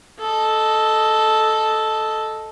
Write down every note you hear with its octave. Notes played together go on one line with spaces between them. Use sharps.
A4 D#5